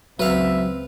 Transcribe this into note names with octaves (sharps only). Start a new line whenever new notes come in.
C#2 F#3 C4 B4 E5 F5